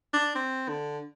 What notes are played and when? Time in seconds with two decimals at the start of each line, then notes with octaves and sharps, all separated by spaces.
0.13 D4
0.35 C4
0.69 D3